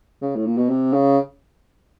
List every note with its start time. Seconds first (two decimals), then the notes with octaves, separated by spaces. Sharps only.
0.22 C#3
0.36 A2
0.47 A#2
0.58 B2
0.70 C3
0.93 C#3